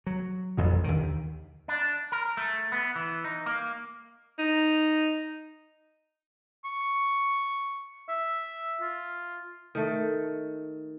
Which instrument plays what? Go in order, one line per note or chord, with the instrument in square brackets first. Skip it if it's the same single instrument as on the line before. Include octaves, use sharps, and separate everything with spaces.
[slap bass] F#3
A1 F2 B2
D#2 D3 D#3
[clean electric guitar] D4
A#4
A3
B3
E3
D#4
A#3
[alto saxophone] D#4
[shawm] C#6
E5
F4
[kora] D#3 A3